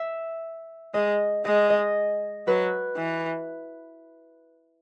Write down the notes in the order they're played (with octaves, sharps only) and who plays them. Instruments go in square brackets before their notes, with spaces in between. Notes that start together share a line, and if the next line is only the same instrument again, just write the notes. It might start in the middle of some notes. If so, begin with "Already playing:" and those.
Already playing: [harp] E5
[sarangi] G#3 [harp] D#5
[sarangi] G#3 [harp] D#5
[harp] D#5
[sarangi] F#3 [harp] B4
[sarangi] E3